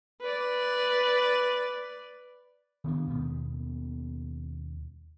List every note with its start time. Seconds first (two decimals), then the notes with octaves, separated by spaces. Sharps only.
0.21 B4 D5
2.84 D#3 B3 D4
3.07 D#2 B2 D#3 B3